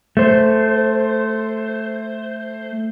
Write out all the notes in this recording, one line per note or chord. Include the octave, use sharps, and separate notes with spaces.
A3 C5